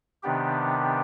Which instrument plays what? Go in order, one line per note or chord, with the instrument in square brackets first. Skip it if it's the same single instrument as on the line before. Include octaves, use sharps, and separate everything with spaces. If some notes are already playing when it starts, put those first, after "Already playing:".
[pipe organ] C3 D#3 B3 D4 G4